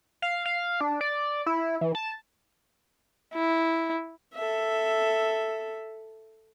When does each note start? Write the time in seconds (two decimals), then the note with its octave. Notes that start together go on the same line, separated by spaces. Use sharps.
0.22 F5
0.46 F5
0.81 D4
1.01 D5
1.46 E4
1.81 E3
1.95 A5
3.34 E4
4.34 A4 E5